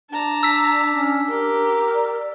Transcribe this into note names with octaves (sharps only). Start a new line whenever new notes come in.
D4 A5 A#5
E6 B6
C#4
G4 A#4
D5